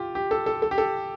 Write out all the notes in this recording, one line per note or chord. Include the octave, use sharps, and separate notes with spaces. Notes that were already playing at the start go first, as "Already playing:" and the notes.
Already playing: F4 G4
G4
A4
A4
A4
G4
A4